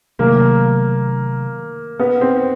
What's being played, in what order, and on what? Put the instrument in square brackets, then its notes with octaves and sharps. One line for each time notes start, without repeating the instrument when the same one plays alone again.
[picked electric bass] C3 D#3 F#3 A3 [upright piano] A#3
[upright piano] B3
C4